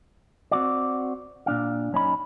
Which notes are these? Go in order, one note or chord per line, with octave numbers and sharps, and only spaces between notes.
C4 F#4 D5
A#2 D4 F5
F#2 C#4 D#4 B5